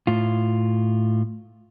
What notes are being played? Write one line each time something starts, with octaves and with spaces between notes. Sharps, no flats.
A2 F4